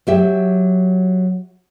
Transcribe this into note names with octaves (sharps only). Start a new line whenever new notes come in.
F#3 G4 E5